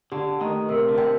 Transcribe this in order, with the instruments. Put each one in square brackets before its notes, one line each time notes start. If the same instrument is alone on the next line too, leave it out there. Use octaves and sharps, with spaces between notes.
[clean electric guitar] D3 [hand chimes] G4
[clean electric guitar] D#3 [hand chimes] A3
[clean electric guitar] C3 [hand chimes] A#4
[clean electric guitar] D3
[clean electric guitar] C3 [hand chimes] G5